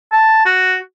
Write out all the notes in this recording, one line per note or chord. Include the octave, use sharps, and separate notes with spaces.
A5
F#4